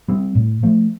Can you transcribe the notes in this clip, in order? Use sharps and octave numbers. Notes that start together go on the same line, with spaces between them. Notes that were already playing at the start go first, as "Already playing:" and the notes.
G3 C4
A2
F3 A3